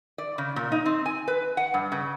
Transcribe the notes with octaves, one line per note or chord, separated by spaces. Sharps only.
D5
C#3
A#2
D#4
C4
G#5
B4
F#5
G2
C#3